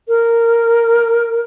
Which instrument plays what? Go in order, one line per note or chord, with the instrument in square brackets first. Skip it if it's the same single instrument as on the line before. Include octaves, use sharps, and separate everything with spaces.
[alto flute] A#4